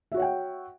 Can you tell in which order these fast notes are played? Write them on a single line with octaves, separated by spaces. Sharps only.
E5 F#4 C#5 F#5 G5